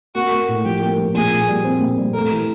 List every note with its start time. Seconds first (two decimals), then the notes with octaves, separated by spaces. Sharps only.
0.15 A#3 F#4
0.32 A#3
0.48 A2
0.65 F3 G4
0.81 A#3
0.98 F3
1.15 A#2 G#4
1.31 A#2
1.48 G3
1.64 C4
1.80 A#2
1.97 G3
2.14 A3 A#4
2.31 E3